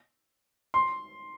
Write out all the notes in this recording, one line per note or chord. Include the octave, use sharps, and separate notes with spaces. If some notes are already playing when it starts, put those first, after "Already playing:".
C6